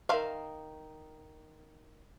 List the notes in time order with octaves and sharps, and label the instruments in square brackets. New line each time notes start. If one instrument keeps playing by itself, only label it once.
[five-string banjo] D#3 F5 [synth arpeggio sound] A#4 E5 C6